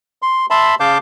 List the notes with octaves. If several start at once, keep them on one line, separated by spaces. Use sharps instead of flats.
C6
E5 A5 B5 C6
C#3 F5 A5 D6 G6